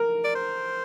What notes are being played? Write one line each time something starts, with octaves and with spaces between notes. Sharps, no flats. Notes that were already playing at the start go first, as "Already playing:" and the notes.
Already playing: A#4
D5
C5